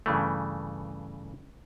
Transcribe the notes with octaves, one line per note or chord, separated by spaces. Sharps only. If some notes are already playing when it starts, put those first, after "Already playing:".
G2 C#3 E3 A3